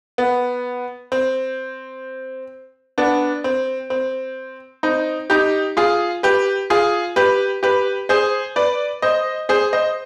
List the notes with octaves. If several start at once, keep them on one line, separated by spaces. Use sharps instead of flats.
B3
C4
B3 D4
C4
C4
C4 D#4
D#4 G4
F4 G#4
G4 B4
F4 G#4
G4 B4
G4 B4
G#4 C5
B4 D5
C5 D#5
G#4 C5
C5 D#5